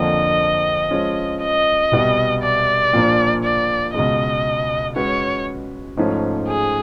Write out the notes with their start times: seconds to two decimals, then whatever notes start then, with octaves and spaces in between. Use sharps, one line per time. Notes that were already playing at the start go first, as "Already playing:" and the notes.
Already playing: F2 D3 F3 A#3 D4 D#5
0.91 F3 G#3 C#4
1.42 D#5
1.92 C2 B2 G3 B3
2.43 D5
2.93 A#2 F3 A#3 D4
3.44 D5
3.94 C#2 B2 G#3 D#5
4.96 G#3 C#4 F#4 B4 C#5
5.97 G#2 F3 A3 C#4
6.48 G#4